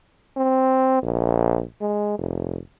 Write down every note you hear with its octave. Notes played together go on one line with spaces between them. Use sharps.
C4
A#1
G#3
F1